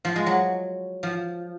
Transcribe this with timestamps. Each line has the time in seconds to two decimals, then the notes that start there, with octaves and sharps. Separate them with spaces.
0.05 F3
0.16 G#3
0.26 F#3
1.03 F3